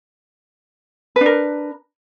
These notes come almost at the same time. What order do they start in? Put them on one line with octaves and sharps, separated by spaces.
B4 D4 A#4